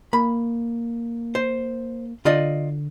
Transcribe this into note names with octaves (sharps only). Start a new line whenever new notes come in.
A#3 B5
C5
D3 F4 D5 D#5